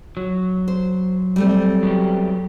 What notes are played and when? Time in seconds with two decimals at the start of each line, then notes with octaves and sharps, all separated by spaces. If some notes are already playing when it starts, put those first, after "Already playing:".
0.17 F#3
0.68 C5
1.36 G3 A3 C4
1.83 F#3 B3 G4